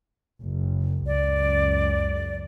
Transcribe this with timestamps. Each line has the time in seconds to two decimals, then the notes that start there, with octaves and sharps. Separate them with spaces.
0.43 F#1
1.07 C#2 F#2 D5